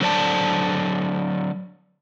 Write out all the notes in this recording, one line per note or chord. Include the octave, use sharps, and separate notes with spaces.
D3 F#3 C5 D5 A5